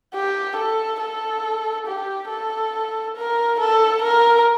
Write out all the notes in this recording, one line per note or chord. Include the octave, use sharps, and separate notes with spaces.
G4
A4
A4
G4
A4
A#4
A4
A#4